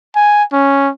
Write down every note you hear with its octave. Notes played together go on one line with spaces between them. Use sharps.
G#5
C#4